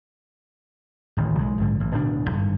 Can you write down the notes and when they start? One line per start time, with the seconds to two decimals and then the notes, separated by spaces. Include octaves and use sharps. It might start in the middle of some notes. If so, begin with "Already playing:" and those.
1.17 D1 A1 D#3
1.38 B1 G#3
1.58 A#1 G#2 D3
1.80 A1
1.93 D1 D2 B2 D4
2.29 G#1 G2 D3